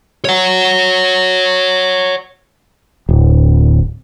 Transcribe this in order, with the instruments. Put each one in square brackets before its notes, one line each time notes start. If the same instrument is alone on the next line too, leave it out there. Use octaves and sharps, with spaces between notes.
[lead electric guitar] C#5 F#5
[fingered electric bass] D1